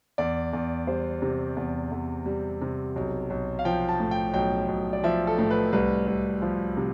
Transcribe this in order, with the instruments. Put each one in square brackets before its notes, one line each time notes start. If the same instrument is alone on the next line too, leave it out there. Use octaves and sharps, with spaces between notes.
[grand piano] E2 D5
E2
G3 C5
C3
E2
E2
G3
C3
B1
B1
F5
F3 G5
A5
A2
G5
B1 G5
B1
D5
F3 E5
A4
A2
B4
C2 B4
C2
F3
C3